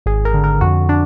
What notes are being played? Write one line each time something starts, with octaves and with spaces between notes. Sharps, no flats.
G#1 G#4
A#4
D3
A#4
F2 F#4
D4